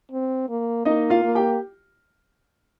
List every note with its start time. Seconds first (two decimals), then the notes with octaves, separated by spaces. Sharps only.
0.11 C4
0.49 A#3
0.85 A#3 D#4 D#5
1.10 F4 F5
1.24 A#3
1.35 G4 G5